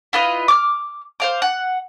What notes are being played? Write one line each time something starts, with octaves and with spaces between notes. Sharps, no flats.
E4 F4 B4 D#5
D6 F6
C5 F5 D6
F#5